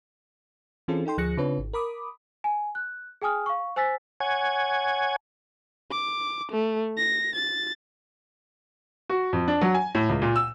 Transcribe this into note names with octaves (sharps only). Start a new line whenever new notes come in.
E3 C4 C#4 F4 G#4 A4
D#4 A4 G5 C6
D2 F3 G#4 F#6 A#6 C#7
C#3 C4 D4 F4 B4 C#5
G#1
A#4 B5 D6 D#6
G#5
F#6
G#4 G5 G#5 D#6 F6
F5 C#6
C5 G#5 E6 A6 B6
C#5 F#5 G#5 G#6
D6
A3
A#6
A6
F#4
F2
D4
F#3
G#5
A2
C#2
A#2
E6